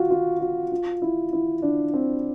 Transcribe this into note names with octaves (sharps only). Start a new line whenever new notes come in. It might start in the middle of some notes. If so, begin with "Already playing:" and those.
Already playing: F4 F#4
F4
F4
F4
E4
E4
D4
C4